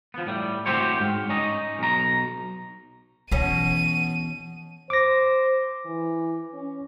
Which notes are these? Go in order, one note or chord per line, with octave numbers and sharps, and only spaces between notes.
F3 B3
A2 G3
A2 C4 F#4 G4 C5 C#5
G#2
C#4 D#4 D#5
B1 A#5
B2 E3 C#4 D#7
C5 D6 A#6
E3
C#4